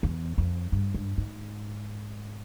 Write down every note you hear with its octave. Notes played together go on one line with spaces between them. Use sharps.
E2
F2
G2
G2
G#2